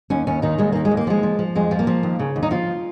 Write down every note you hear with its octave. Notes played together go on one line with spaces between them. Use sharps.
D#2 C#4
D#2 C#4
D#3 D#4
D#2 G#3
D#3 A#3
G#3
D#2
A#3
F3 G#3
F3
F3
F2 G#3
F3
A#3
F3
D#2
C#3
D#2
D#4
F3 F4